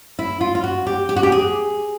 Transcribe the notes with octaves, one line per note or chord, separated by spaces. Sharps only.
E4
F4
F4
F#4
G4
G4
F#4
G4
G#4